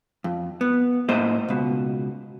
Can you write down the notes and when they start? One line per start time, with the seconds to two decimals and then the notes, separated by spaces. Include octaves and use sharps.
0.24 F2
0.61 B3
1.09 A2 A#3 C5 D#5
1.48 C#2 B2